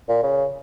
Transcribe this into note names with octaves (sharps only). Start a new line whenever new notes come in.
A#2
C#3